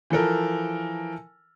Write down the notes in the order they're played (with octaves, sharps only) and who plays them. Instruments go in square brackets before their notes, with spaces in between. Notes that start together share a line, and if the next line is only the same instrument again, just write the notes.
[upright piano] E3 F3 A4 A#4